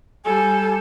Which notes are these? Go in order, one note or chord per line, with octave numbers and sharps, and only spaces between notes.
G3 A4 G#5